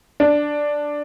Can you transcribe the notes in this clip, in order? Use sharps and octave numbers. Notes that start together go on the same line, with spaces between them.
D4